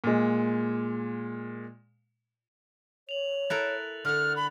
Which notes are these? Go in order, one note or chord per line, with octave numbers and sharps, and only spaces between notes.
A#2 G#3
C#5 F7 F#7
E4 A4 A#4 F#6 A6
D3 A4 F#5 F6
B5